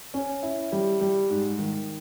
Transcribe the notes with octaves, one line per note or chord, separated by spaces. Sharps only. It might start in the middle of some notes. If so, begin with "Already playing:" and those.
C#4
E4
G3
G3
G#2
D#3